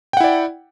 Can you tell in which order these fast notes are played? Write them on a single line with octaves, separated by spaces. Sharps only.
G5 F#5 E4 D5